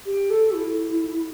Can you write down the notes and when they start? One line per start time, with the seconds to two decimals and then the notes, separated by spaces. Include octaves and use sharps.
0.06 G4
0.30 A4
0.55 E4